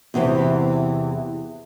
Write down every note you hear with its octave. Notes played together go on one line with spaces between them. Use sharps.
E2 C3 E3 B3 C4